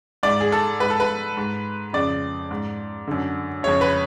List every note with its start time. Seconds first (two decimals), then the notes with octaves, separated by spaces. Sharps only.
0.23 G#2 D5
0.41 G#4
0.52 A4
0.80 G#2 B4
0.90 A4
1.00 B4
1.37 G#2
1.93 F2 C#3 D5
2.51 G#2
3.07 F#2 D3
3.63 F2 C#3 C#5
3.81 B4